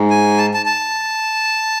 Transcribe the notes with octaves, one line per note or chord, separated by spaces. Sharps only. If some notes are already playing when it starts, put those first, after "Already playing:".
Already playing: G#2
G#5
A5
A5
A5